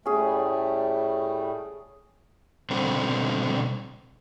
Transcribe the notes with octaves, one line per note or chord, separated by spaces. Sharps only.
A2 G3 A3 C#4 G#4
B2 D3 G3 C4 A4 C5